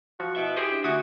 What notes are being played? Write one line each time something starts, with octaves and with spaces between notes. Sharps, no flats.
F3 F#4
B2 E4 E5
G4 G#4 C5 D#5
D4
D2 F#4 E5 G#5 D6 D#6